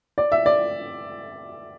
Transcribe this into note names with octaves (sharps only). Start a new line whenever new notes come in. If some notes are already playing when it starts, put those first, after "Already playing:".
D5
E5
D5